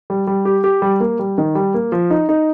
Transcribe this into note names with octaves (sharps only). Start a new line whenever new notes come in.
G3
G3
G4
G4
G3
A#3
G3
D#3
G3
A#3
F3
D#4
D#4